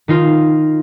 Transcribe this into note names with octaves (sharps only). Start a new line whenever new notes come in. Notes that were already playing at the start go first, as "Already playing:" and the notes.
D#3 D#4 F4